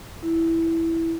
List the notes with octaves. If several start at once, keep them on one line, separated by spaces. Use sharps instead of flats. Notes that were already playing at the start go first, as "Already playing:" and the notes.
E4